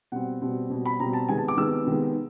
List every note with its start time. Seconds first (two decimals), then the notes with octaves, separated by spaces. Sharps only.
0.12 B2 G3 C4 F#5
0.42 B2 G3 C4
0.70 B2 G3 C4
0.86 B5
1.00 B2 G3 C4 A#5
1.13 A5
1.29 C3 D#3 G#3 B3 G#5
1.38 A5
1.48 D6
1.57 C3 D#3 G#3 B3 E6
1.87 C3 D#3 G#3 B3